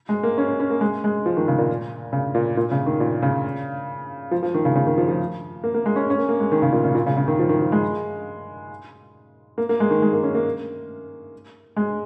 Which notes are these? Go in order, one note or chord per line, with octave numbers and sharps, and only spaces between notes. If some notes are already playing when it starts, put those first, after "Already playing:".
G#3
A#3
C#4
C#4
C#4
A#3
G#3
G#3
F3
D#3
C#3
A#2
C#3
A#2
A#2
C#3
D#3
A#2
C#3
F3
F3
D#3
C#3
C#3
D#3
F3
F3
A#3
A#3
G#3
C#4
C#4
A#3
A#3
G#3
D#3
C#3
A#2
C#3
A#2
C#3
C#3
D#3
F3
D#3
F3
G#3
A#3
A#3
G#3
D#3
G#3
A#3
C#4
A#3
G#3